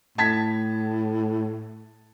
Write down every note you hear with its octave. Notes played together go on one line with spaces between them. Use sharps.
A2 A5 G#6 B6